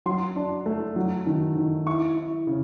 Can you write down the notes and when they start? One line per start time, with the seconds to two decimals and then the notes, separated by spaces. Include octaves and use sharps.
0.06 F#3 C6
0.36 D4
0.66 A3
0.96 F#3
1.27 D#3
1.57 D#3
1.86 E4 C#6
2.17 E4
2.47 C#3